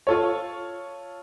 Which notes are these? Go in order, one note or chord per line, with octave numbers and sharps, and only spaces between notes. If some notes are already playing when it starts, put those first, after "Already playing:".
F4 A4 C#5